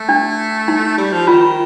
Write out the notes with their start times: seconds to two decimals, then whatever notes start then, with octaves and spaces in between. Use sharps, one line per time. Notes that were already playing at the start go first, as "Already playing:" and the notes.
Already playing: A3
0.09 D4
0.68 D#4
0.98 G3
1.13 F3
1.27 D#3 F4